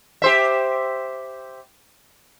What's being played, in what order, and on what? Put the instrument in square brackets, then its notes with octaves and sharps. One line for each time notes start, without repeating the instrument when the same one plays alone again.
[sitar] G4 C5 E5